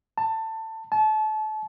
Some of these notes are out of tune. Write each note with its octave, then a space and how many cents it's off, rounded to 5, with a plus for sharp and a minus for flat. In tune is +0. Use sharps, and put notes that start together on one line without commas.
A5 +20
A5 -30